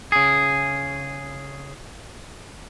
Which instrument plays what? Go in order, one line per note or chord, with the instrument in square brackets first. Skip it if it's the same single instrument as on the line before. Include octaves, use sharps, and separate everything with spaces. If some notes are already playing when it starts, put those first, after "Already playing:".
[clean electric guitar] C#3 G#4